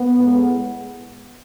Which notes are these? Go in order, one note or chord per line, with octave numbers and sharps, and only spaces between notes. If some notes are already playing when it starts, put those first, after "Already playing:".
Already playing: B3
A2 G#3